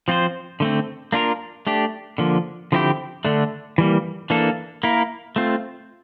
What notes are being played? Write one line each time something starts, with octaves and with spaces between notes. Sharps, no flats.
F3 C4 F4 C5
D3 A3 C4
A#3 D4 F4 A#4
A3 D4 G4
D3 F3 A#3
D3 F3 C4 E4 G4
D3 A3 D4
E3 G3 A#3
E3 A#3 D4 A4
A#3 E4 A#4
A3 C4 F4